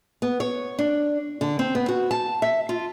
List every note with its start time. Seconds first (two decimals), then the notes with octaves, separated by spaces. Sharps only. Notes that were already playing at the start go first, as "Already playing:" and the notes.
0.22 B3
0.40 C#5
0.79 D4
1.41 D3
1.59 C4
1.75 B3
1.88 F#4
2.11 A5
2.42 E5
2.69 F4